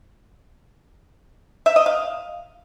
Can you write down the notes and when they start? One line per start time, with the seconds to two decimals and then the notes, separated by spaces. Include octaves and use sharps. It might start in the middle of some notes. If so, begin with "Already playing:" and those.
1.66 E5
1.76 D#5
1.86 F5